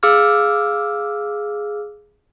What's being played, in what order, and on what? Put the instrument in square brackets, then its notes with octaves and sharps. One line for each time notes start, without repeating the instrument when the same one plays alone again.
[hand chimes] G#4 F5 D6 E6 F6